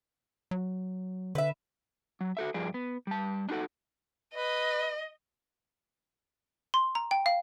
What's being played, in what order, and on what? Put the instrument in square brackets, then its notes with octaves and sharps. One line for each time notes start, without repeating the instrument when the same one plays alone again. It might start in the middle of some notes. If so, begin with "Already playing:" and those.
[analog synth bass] F#3
[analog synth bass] D3 [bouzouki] B4 E5
[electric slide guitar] F#3
F#4 A4 E5
G2 F3 G#4 D5
B3
G3 A5
D4 D#4 F#4 A4 F#5
[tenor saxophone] B4 [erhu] D#5
[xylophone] C6
A#5
G5
F5